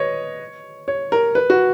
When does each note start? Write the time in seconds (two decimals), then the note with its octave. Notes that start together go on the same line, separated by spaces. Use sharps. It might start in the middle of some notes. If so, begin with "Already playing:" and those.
Already playing: B4 C#5 D#5
0.88 C#5
1.12 A#4
1.35 B4
1.50 F#4